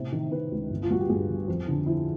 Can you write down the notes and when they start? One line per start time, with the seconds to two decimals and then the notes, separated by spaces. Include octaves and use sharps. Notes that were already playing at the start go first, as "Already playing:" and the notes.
Already playing: A2 C3
0.12 D#3
0.31 C3 B4
0.52 C#2
0.70 G1
0.83 F4
0.90 G2 F#4
1.00 G4
1.09 G2 G#4
1.29 G1
1.48 F2
1.68 D3
1.86 F3 E4